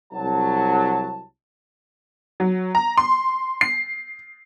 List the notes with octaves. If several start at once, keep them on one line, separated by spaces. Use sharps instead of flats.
C2 F#3 A5
F#3
A#5
C6
C7